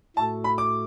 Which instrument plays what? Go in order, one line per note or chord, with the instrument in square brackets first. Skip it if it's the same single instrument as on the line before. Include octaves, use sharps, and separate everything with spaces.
[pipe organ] A2 A3 F#4 A4 [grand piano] A5
[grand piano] B5
D6